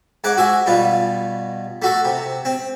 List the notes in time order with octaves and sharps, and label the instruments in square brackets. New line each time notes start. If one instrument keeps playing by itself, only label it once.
[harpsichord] G#2 F#5 D6
F#4 E5 G#5
G2 B2 F4
A3 F#4 A4
C3
C4